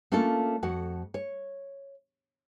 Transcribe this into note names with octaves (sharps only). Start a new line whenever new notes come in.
A3 A#3 C#4 D4 F4 A4
F2 F#4 F#5
C#5